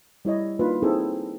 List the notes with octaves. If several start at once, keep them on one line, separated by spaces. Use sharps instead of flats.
G3 E4 C#5 D#5
A#3 D4 D#4 F4 B4
C4 D#4 E4 G#4 A4